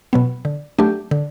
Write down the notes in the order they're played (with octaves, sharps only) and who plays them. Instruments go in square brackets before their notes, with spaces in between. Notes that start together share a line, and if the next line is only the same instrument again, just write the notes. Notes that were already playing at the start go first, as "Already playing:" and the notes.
[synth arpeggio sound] B2 F#3 B3
D3
F#3 A3 D4 G4
D3